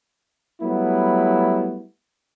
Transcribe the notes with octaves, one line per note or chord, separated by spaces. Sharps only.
F#3 G3 A3 B3 E4